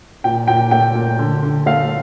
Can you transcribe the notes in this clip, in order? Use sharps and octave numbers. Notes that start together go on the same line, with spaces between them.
A#2 G5
A#2 G5
A3 G5
A#2
D3
D3
A3 F5